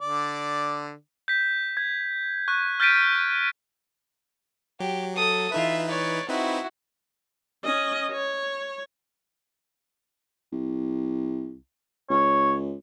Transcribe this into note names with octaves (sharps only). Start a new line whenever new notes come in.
D3 D5
G6 B6
G#6
C#6 F#6
F6 G6 A6 B6 D7 D#7
F#3 G4
A4 D#6
E3 D#4 F4 B4 E5
C#5 D5
C4 D#4 E4 F#4 B4
C#4 D#5
C#5
C2
C#2 C#5